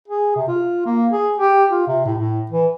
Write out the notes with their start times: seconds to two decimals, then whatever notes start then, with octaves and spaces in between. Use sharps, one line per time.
0.08 G#4
0.36 C3
0.48 F4
0.86 A#3
1.12 G#4
1.38 G4
1.70 F4
1.88 C3
2.05 A2
2.18 A2
2.51 E3